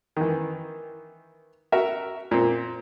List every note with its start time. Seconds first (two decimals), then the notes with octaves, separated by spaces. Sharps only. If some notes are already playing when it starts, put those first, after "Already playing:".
0.17 D#3 E3
1.72 F#4 A#4 E5
2.31 A#2 C4